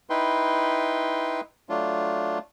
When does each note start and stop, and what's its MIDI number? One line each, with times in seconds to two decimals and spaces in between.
0.10 1.41 63
0.10 1.41 64
0.10 1.41 71
0.10 1.41 79
0.10 1.41 84
1.69 2.39 54
1.69 2.39 57
1.69 2.39 62
1.69 2.39 65